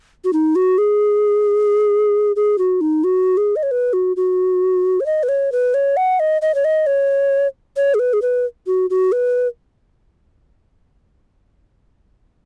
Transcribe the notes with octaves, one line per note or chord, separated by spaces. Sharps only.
F#4
D#4
F#4
G#4
G#4
F#4
D#4
F#4
G#4
D#5
C#5
B4
F#4
F#4
C#5
D#5
B4
C#5
B4
C#5
F#5
D#5
D#5
C#5
D#5
C#5
C#5
G#4
B4
G#4
B4
F#4
F#4
B4